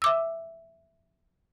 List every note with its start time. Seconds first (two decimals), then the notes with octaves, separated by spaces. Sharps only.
0.02 E5 D6 E6